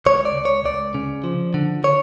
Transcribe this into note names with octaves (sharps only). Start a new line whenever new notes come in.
C#2 C#5
D5
C#2
C#5
C#2 D5
C#3
F3
D3
D3 C#5